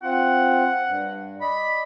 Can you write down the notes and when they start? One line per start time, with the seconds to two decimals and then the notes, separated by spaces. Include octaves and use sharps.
0.03 C4 F4 F#5
0.87 G2
1.41 D5 D#5 B5